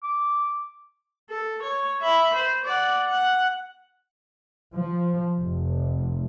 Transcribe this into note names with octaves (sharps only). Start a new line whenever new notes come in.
D6
A4
C#5
E5 B5
C5
D5 F#5
F#5
F3
F1